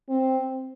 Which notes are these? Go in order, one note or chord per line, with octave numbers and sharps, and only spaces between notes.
C4